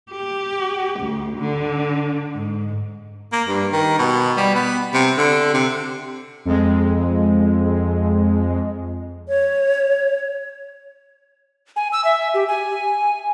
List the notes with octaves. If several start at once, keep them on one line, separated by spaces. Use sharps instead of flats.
G4
D2
D3
G#2
A#3
G2
D#3
B2
G3
B3
C3
D3
C3
F2 G#3
C#5
G#5
E6
E5
G4
G#5